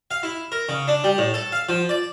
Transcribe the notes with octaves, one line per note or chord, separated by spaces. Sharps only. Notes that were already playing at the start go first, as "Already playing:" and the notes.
F5
E4
A#4
C#3
D4
G3
A2
A4
F5
F3
D5